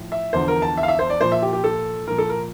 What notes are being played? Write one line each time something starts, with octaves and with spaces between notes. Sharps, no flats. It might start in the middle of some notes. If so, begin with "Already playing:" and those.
Already playing: A2 F3
E5
E2 D3 F3 C5
A#4
A5
E5
F5
E5
C5
D5
A#2 F3 C5
E5
G4
G4
A4
A#2 F3 A#4
A4
A#4